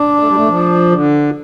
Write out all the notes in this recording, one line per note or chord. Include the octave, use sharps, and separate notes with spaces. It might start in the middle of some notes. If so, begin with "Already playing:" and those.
Already playing: D4
A3
G3
A3
F3
D3